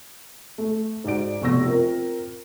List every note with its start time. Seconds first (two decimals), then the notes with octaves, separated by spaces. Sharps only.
0.58 A3
1.04 G#2 F#4 D5 D7
1.42 F1 B2 C#6 E6 A#6
1.65 C4 F4 A#4